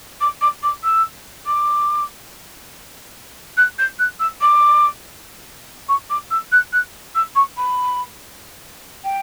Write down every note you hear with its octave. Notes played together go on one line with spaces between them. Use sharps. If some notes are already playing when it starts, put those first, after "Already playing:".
D6
D6
D6
E6
D6
F#6
G6
F#6
E6
D6
C#6
D6
E6
F#6
F#6
E6
C#6
B5
G5